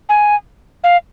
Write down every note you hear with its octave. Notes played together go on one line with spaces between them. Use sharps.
G#5
F5